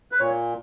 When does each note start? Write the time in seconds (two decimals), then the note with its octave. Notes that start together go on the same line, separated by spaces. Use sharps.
0.12 B4
0.20 A#2 C#5